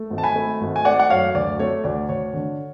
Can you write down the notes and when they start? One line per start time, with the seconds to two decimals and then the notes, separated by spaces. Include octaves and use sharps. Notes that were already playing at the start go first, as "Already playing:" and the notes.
Already playing: A3
0.10 G#1
0.18 A5
0.24 G#5 B5
0.36 A3
0.61 G#1
0.76 G#5
0.85 A3 D5 F#5
0.99 F#5
1.10 F#2 C#5 F5
1.35 D2 D5
1.59 A3 C#5
1.84 D2 D5
2.09 D2 C#5
2.34 D3